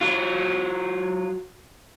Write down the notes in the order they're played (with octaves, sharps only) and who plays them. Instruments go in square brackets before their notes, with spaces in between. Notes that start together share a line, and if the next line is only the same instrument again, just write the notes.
[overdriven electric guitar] F#3 F4